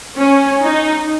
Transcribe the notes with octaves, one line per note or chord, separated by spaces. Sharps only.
C#4
D#4